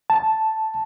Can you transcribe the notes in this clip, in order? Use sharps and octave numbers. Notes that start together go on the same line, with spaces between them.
A5